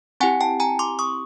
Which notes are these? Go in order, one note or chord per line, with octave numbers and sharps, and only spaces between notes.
C4 E4 G4 F#5 G#5
G5 A5
G#5 A#5
C6 D6
C#6 D#6